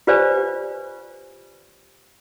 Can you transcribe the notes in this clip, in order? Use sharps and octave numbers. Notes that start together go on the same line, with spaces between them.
F4 G4 B4 C5 D5 G#5